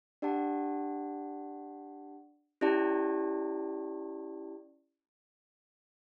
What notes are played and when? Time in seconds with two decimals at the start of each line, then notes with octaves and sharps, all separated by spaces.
0.22 D4 G4 D5 F#5 A5
2.61 C#4 E4 G4 D5 A5